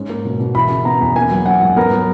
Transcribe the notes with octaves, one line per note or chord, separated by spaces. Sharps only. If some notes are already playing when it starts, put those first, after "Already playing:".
Already playing: G#2 C#4
A#3
B2
B2
E3 B5
C#3
B3 A#5
E2
A#3 G#5
F#3
C#4 F#5
G#2
B3 A#4
F#3